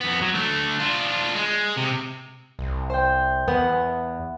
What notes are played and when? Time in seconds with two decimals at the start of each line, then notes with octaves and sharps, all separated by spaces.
0.01 F2 B3
0.21 F#3
0.34 A3 D4
0.79 D4 F4
1.35 G#3
1.77 C3
2.59 C2
2.90 C5 G5
3.48 E2 B3 F#5